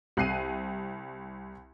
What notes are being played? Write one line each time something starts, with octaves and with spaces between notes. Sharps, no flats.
C2 F#6 C7 D#7